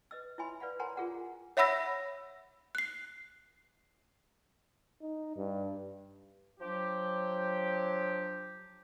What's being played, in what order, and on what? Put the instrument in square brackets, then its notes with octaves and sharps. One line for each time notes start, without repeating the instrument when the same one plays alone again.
[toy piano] B4 D#5 E6
E4 C#5 E5 G#5 B5 C6
B4 D5 F5 F#5 B5
A#4 C#5 F#5 G#5 A#5 C6
F4 G#4 A#4 F#5
[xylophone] C#5 E5 F#5 B5 E6 A#6
F#6 C7
[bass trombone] D#4
G2
[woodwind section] F3 F#3 D4 G4